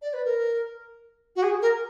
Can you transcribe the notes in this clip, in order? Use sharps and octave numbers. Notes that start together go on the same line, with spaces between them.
D5
B4
A#4
F#4
G#4
A#4